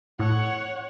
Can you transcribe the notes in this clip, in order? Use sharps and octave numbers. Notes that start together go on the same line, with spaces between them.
A2 C#5 F#5